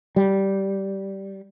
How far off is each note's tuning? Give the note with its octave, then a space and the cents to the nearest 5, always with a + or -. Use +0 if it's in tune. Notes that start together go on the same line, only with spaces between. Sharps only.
G3 -10